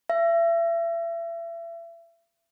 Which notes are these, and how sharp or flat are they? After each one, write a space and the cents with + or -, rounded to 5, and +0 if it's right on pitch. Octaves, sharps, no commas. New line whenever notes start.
E5 +35